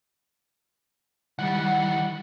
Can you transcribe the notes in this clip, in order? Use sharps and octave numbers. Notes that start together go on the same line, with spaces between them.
D#3 E3 G3 F#5